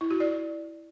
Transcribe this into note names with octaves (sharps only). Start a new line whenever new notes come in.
E4
F#4
D5